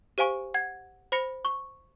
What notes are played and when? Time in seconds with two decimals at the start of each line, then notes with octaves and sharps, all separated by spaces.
0.18 G4 C5 F5 G#5 C#6
0.54 F#5 G#6
1.12 C5 B5 A#6 C#7 F7
1.45 C#6